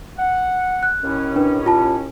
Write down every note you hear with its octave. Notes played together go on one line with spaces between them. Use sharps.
F#5
F#6
D#2 A2 C#4
D4 B4
F4 A5